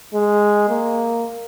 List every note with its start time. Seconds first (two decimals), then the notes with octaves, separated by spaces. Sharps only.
0.14 G#3
0.69 A#3